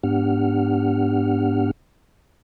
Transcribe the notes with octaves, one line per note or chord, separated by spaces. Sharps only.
G#2 B3 D4 G4 F#5 F6